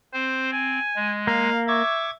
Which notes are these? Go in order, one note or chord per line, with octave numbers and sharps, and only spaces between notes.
C4 C5
G#5
G#3
A#3 F5
E5 C#6 D6 G#6